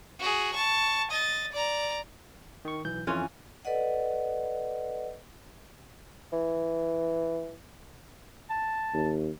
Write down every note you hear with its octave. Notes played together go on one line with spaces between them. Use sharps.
F#4 G#4
A5 C#6
D#5 A6
D5 A#5
D#3 C#6
B1 E3 G6
F2 E3 C#4 F4
A4 B4 D5 D#5 F#5
E3
A5
D#2